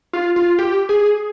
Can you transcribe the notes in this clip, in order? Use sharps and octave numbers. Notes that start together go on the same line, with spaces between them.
F4
F4
G4
G#4